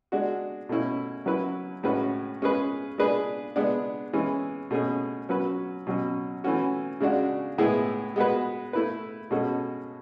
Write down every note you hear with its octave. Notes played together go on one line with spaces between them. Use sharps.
G#3 D4 F#4
B2 A3 C#4 E4
F#3 C#4 E4 B4
A2 G#3 C#4 F#4 B4
G#3 C#4 G#4 B4
G#3 D4 G#4 B4
G#3 B3 D4
E3 G#3 C#4
B2 A3 C#4 G#4
F#3 C#4 F#4 B4
B2 F#3 C#4
E3 A3 C#4 F#4
C#3 G#3 D4 F#4
A2 G#3 B3 E4 G#4
G#3 B3 F#4 B4
A3 E4 B4
B2 G#3 C#4 F#4 A4